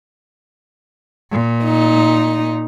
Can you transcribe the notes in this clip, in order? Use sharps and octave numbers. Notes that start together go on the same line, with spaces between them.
A#2
D#4